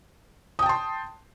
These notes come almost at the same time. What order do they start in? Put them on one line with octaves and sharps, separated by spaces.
D#6 G5 A5 C6